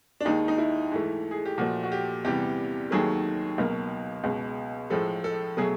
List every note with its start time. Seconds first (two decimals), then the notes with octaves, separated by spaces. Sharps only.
0.21 D4
0.25 D#2 D#3 G#3 D#4
0.48 D#4
0.58 E4
0.92 G#2 E3 A3
1.31 G#4
1.45 G4
1.58 A#2 F3 A3 F#4
1.84 F#4
1.92 G4
2.25 E2 C3 E3 G3 G4
2.91 D#2 D#3 F#3 A3 G#4
3.58 C#2 B2 F#3 A#3
4.24 C#2 B2 G#3
4.90 A2 F3 G#3 A4
5.24 A4
5.57 B2 F#3 A3 G#4